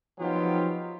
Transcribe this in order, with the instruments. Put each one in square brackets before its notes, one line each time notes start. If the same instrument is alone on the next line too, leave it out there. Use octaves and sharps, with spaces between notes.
[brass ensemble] F3 F#3 B3 D#4 F4 G4